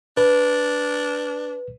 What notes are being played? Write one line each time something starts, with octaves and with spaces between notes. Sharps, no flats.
D4 B4